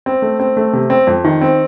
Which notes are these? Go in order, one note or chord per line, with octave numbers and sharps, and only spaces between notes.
C4
A3
C4
A3
C3
C4
F2
D#3
C4